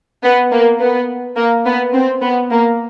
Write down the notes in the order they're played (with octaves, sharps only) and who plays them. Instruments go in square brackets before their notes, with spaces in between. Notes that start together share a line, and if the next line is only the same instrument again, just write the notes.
[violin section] B3
A#3
B3
A#3
B3
C4
B3
A#3